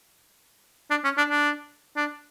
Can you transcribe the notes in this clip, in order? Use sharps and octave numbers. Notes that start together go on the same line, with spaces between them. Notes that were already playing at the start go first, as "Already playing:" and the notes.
D4
C#4
D4
D4
D4